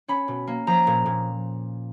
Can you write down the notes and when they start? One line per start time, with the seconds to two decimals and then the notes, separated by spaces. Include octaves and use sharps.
0.08 C#4 B5
0.28 B2
0.47 A#3
0.67 F3 A#5
0.87 A#2
1.06 A#2